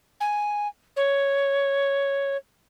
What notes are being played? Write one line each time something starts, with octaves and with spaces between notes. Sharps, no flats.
G#5
C#5